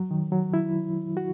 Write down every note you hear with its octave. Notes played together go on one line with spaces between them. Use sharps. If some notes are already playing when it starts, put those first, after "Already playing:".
Already playing: F#3
D#3
F#3
E4
F#4